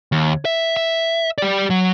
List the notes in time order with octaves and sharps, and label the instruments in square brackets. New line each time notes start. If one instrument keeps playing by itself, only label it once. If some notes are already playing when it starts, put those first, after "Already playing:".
[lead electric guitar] D#2
E5
E5
G4 D5
F#3